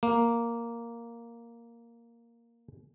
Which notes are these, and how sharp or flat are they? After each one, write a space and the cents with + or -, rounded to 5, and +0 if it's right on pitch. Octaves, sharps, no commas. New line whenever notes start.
A#3 +0